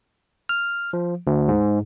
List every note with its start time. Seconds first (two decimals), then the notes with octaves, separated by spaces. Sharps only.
0.49 F6
0.93 F3
1.27 D2
1.48 G#2